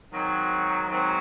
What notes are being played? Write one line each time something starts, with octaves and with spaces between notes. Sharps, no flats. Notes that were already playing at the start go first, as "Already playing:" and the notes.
G#2 D#3 F#3 C4
G#2 D#3 F#3 C4